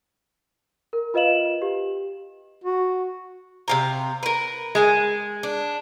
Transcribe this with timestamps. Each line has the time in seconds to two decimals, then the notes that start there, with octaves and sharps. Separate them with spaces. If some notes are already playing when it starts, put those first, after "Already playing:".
0.93 A#4
1.14 F4 B4 D#5 F5 E7 F#7
1.62 G4
2.64 F#4
3.68 C3 F5 A#5
4.23 A#4 B4
4.75 G#3 G#5
5.43 D4